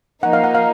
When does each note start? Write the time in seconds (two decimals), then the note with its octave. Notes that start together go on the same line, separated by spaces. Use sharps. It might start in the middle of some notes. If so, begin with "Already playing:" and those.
0.23 F3 A#3 D#4 F#5
0.33 F5
0.44 F#5
0.55 F5